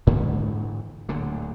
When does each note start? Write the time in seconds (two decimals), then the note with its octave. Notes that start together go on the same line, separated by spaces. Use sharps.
0.07 G#2 D3 E3 A3
1.09 D1 D2 A#2 D3